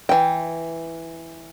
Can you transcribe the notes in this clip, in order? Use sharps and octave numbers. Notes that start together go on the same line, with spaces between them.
E3 G5